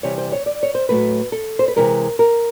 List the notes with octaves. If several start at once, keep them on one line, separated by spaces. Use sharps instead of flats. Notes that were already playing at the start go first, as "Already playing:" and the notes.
C3 E3 G3 C#5
C5
C#5
D5
C#5
C5
A2 F#3 A3 B4
A4
C5
B4
C3 E3 G#3 A#4
A#4